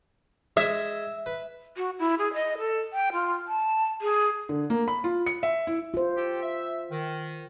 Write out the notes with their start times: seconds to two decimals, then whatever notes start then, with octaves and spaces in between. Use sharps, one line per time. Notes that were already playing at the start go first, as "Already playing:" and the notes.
0.57 G#3 E5
1.26 B4
1.77 F#4
1.99 E4
2.18 G#4
2.34 D#5
2.58 A4
2.93 G5
3.12 F4
3.48 A5
4.01 G#4
4.49 D3
4.70 A#3
4.88 B5
5.04 F4
5.26 C#7
5.43 E5
5.67 E4
5.94 F4 C5
6.16 G4 A4 G5
6.42 E5
6.91 D#3